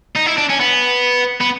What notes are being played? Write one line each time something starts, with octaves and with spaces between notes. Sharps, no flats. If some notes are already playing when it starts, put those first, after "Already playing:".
D#4
E4
D4
C#4
B3
B3